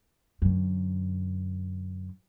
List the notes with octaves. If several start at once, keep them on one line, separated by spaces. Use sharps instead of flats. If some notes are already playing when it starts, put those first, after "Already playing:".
F#2 D3